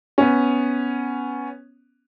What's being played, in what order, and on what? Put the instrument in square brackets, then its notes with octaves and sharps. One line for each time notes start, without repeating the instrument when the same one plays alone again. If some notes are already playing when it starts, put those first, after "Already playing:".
[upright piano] B3 C#4